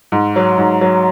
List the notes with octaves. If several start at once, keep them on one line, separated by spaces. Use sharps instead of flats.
G#2
F#3
G#2
F#3